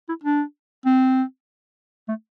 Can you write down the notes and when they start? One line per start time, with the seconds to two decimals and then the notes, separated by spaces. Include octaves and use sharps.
0.09 E4
0.24 D4
0.86 C4
2.08 A3